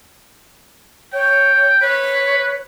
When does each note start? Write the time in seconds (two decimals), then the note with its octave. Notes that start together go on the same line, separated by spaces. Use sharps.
1.13 C#5 G5
1.81 B4 C#5